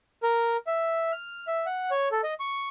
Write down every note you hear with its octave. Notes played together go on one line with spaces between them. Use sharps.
A#4
E5
F6
E5
F#5
C#5
A4
D#5
C#6